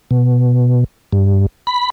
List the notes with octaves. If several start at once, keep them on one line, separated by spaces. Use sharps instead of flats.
B2
G2
B5